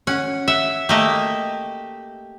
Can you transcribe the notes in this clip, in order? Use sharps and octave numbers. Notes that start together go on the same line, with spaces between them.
C#4 F#5
E5 F#5
A3 A#3 G4 D#5